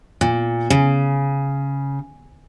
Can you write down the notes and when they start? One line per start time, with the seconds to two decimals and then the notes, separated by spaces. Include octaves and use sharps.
0.21 A#2
0.70 C#3